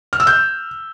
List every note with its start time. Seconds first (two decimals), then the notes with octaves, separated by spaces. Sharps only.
0.13 F6
0.20 E6
0.27 G6